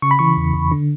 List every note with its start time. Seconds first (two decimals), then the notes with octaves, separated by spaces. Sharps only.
0.02 C#3 C#6
0.11 B5
0.19 E3 C#6
0.37 E2
0.54 E2
0.71 D3